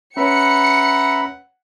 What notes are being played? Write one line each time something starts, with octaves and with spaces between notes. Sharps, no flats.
C#4 B4 C#5 E5 F#5 A#5 B5 C#7